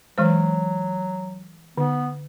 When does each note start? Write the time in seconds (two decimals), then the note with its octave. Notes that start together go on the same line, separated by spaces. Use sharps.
0.18 E3 F#3 G#3 C5
1.77 D3 B3